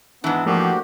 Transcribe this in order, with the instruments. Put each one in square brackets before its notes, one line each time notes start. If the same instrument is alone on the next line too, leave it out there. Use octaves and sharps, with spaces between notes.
[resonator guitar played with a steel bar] G#2 E3 [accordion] B3 [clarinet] D4
[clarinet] F3 [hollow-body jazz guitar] A3 A#3 D4 [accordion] F#4 G4